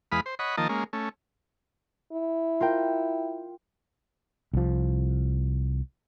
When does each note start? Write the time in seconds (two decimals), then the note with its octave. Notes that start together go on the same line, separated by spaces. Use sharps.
0.12 E2 G#3 B4 F5 B5 D#6
0.26 C5
0.39 C#5 D#5 F#5 B5
0.57 D#3 F3 A#3 D#5 A5
0.69 G#3 A#3 C#4
0.93 A3 C#4
2.12 E4
2.61 F4 A#4 G5
4.54 C2 F3